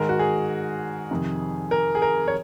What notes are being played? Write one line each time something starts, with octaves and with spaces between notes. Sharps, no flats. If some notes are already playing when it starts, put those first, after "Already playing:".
Already playing: G#2 D#3 G#3 A#4
F#4
G#4
F2 C3 D#3
A#4
G#4
A#4
C#5